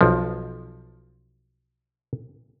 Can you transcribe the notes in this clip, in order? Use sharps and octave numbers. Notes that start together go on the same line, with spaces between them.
B1 F3